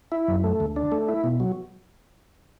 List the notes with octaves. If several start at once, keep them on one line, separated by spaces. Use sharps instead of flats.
E4
F#2
A3
D2
D4
A3
E4
B2
F#3